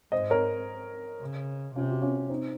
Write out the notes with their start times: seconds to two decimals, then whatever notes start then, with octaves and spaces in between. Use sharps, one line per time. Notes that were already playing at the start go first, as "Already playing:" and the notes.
0.12 G#2 C5 D#5
0.30 A#4 C#5
1.21 C#3
1.75 C3 C#4 F4
1.90 F#4
2.02 C#4 F4
2.29 C4 D#4